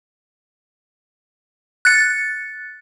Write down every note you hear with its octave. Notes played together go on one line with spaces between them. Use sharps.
F#6 A6 C#7